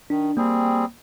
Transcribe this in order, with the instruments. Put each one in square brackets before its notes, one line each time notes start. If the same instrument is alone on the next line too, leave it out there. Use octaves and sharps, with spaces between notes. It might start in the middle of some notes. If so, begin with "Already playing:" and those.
[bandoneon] D#3 [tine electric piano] D4
[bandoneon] G3 C4 G#4 [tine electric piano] A#3